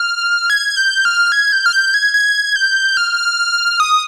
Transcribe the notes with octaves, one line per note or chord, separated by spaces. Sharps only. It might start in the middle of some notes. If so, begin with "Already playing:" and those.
Already playing: F6
G#6
G6
F6
G#6
G6
F6
G6
G#6
G#6
G6
F6
D#6